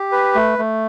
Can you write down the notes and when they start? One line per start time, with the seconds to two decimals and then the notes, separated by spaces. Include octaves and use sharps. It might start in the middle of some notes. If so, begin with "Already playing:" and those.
Already playing: G4
0.12 B4
0.35 A3
0.59 A3